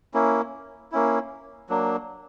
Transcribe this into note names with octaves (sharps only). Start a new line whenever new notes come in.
A#3 C#4 E4
A#3 C#4 E4
F#3 A#3 D4